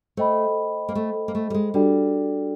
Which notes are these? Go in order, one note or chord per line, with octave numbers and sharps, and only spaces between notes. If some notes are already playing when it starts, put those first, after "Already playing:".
A3 C5 D#5 G5 B5
A#3
A3
A#3
A3
G3
G#3
G3 D4 F#4 A4 D5 G5